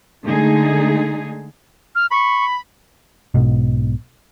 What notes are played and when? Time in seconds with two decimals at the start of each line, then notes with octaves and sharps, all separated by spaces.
0.25 D3 G#3 A3 D#4 G#4
1.95 F6
2.11 B5 C#6
3.34 B1 G#2 B2